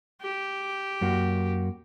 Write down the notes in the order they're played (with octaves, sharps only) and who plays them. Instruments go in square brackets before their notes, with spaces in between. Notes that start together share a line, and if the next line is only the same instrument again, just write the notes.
[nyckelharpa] G4
[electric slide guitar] F#2 A#3 F#4